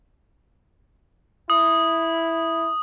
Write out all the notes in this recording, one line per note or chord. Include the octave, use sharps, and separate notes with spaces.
E4 D#6